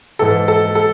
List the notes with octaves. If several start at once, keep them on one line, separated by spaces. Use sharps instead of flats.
G#2 E3 A4
A4
A4